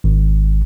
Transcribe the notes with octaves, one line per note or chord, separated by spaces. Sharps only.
G#1